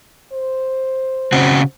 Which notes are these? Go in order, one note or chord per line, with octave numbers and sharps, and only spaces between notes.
C5
C#3 C4 F#4